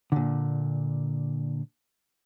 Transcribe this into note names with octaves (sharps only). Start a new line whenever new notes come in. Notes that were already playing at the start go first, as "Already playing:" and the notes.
A#2 D3